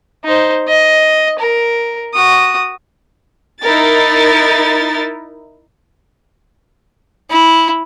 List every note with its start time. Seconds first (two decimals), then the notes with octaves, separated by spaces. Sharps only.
0.25 D#4 C5
0.68 D#5
1.39 A#4
2.14 F#4 D#6
3.63 D#4 E4 A#4 A6
7.31 E4